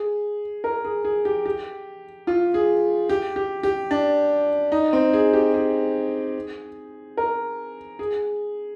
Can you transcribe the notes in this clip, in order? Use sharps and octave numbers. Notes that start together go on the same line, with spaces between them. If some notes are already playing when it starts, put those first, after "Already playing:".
Already playing: G#4
A#4
G#4
G#4
G4
G4
F4
G#4
G4
G4
G4
D4
D#4
C4
G#4
G4
G#4
A#4
G#4